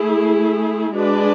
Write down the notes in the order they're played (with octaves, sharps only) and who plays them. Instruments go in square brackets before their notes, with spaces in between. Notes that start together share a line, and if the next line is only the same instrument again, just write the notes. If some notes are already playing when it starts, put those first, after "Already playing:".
Already playing: [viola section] A3 E4 G#4
G#3 D4 F#4 B4 D5